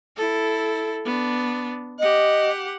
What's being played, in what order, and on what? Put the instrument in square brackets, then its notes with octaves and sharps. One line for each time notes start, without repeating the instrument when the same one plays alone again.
[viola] E4 A4
B3 D4
[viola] G4 F#5 [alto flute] D#5